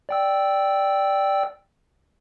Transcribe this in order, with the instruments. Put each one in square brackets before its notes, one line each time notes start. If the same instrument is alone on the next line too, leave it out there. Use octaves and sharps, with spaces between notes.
[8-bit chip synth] D5 G5 E6